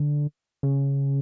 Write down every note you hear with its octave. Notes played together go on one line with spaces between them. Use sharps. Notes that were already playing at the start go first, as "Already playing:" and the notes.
Already playing: D3
C#3